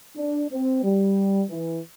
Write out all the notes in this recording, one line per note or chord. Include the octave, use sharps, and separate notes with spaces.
D4
C4
G3
E3